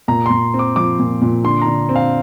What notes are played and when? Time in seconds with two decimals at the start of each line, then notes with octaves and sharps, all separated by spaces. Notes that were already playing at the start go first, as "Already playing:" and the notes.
0.08 A#2 A#5
0.26 A#2 C6
0.54 C4
0.59 D6
0.76 F3 D6
0.99 A#2
1.22 A#2
1.44 D3 C6
1.61 D3 A#5
1.89 C4
1.96 F5